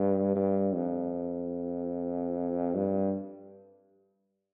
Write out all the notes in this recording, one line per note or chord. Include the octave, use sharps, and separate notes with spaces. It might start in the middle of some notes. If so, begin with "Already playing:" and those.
Already playing: G2
G2
F2
G2